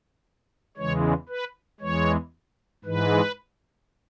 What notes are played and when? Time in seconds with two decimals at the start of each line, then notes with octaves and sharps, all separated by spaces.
0.77 E2 C#3 E3 G#3 C#5
1.29 B4
1.80 E2 E3 G#3 C#5
2.84 G#2 E3 G#3 B4